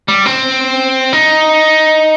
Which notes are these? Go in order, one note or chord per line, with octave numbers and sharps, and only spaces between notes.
G3
C4
D#4